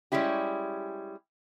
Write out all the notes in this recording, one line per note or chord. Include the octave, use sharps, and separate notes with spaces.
G3 G#3 C#4 E4 G4